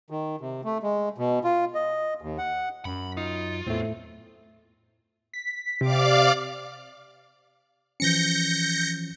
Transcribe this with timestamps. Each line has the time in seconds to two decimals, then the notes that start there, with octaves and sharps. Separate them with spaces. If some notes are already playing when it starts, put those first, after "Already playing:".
0.10 D#3
0.41 C3
0.64 A3
0.83 G#3
1.18 B2
1.44 F4
1.75 D#5
2.22 D#2
2.38 F#5
2.85 F#2 B5
3.17 D#4 F4
3.67 E2 A2 A3 C4
5.33 B6
5.81 C3 D5 F5 D6
8.00 E3 F3 C#4 G6 A#6 C#7